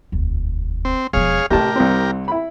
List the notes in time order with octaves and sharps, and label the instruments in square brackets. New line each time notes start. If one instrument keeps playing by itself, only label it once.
[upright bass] E1 D2
[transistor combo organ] C4
[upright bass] E1 F3 [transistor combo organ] G#4 C#5 F5
[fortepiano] A1 C3 A5 [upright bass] D#4 E4 [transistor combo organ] G4 A#4
[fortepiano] C2 C4
E4 B5